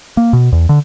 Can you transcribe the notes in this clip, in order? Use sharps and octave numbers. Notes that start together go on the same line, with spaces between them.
A#3
B2
E2
D3